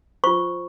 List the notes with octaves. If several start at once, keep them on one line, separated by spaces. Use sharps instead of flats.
F4 C5 C#6